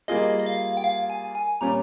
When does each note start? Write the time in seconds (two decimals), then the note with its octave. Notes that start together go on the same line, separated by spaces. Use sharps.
0.08 G3 A#3 F4 G#4 D#5
0.40 D#5
0.46 F5
0.77 G5
0.84 F5
1.10 G#5
1.35 G#5
1.61 A#2 G3 C#4 A#5